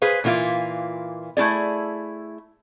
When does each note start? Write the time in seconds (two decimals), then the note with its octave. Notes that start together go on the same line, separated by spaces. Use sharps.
0.02 G#4 B4 C5 F5
0.24 A#2 E3 A#3 F4 E5
1.37 A3 E4 G#4 D5